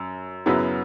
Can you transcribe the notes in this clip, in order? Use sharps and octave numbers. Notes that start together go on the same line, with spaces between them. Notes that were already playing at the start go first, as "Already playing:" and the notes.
Already playing: F#2
F#2 C#3 F#3 B3 E4